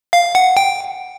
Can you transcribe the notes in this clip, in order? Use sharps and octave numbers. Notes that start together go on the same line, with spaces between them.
F5
F#5
G5